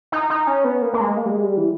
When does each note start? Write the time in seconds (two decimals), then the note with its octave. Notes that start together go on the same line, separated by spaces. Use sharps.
0.12 D#4
0.30 D#4
0.47 C#4
0.65 B3
0.82 A#3
0.93 A#3
1.00 G#3
1.17 A#3
1.26 G3
1.30 G#3
1.44 G3
1.57 E3